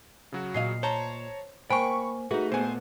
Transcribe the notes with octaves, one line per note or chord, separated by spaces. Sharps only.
C#3 F#3 F#4
A#2 D#5 F5 C7
C5 C#5 A5 A#5
A#3 C5 G5 G#5 B5 C#6
A3 D#4 F#4 G#4 B4
A#2 B3 C5 G#5